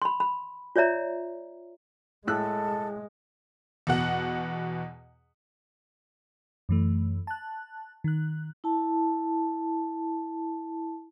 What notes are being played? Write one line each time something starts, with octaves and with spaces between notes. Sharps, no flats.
B5 C6
B5
F4 C#5 D5 E5 A#5
A2 G#3 A4 E6 F#6
E2 B2 F#5
F#2 E3 A3
A5 F#6
D#3 F#6
E4 A5